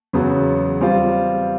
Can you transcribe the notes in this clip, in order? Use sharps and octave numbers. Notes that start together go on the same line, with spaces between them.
E2 C#3 F#3 B3
G3 C4 F4